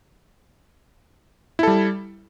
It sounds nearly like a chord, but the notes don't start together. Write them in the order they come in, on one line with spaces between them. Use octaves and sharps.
E4 A4 G3